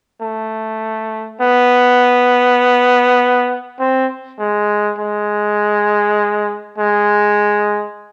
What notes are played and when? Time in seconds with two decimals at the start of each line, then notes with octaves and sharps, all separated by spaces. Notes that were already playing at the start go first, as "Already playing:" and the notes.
0.22 A3
1.41 B3
3.80 C4
4.39 G#3
4.98 G#3
6.78 G#3